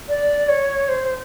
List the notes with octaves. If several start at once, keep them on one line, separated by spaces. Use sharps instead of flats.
D5
C#5
C5